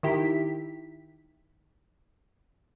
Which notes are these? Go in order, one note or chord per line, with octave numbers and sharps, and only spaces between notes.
D#3 E4 G4 B6